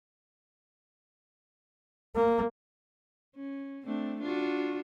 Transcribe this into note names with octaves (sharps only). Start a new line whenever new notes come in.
A#3
C#4
A3 C4 D4
D4 F4 F#4